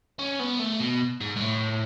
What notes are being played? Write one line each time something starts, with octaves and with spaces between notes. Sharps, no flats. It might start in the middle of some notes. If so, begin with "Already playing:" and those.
C#4
B3
A3
B2
G#2
G#2
A2